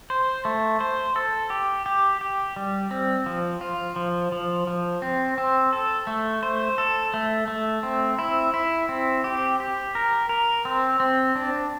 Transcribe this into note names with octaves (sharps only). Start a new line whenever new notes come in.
C5
A3
C5
A4
G4
G4
G4
G3
C4
F3
F4
F3
F3
F3
C4
C4
A4
A3
C5
A4
A3
A3
C4
E4
E4
C4
G4
G4
A#4
A#4
C4
C4
D4